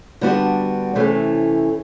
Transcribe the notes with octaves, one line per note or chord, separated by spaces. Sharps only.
D3 G3 B3 D4 F#4
C3 E3 A3 C#4